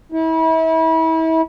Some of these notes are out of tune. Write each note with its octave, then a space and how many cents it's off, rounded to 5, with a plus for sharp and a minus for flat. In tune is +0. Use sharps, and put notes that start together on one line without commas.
E4 -35